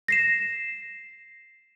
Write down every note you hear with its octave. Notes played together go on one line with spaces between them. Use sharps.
A#6 C7 E7